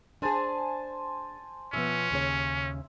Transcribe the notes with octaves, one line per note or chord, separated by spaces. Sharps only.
D4 G#4 C5 G#5 A5
B2 F3 B3 C#4 E5
D#2 C#3 C#5